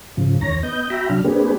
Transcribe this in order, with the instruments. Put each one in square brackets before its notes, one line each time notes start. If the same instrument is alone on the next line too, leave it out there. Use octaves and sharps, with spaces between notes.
[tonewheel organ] G#2 C#3 F3
E2 D#3 C#5 A#5 A#6
B3 D#5 G6
F#4 E5 G5 A#5 B5
C3 F#3 D4 F6
A#3 C4 D4 G4 G#4 B4